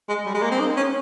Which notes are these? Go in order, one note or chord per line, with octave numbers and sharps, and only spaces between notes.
G#3
G3
G#3
A#3
C4
D#4
C#4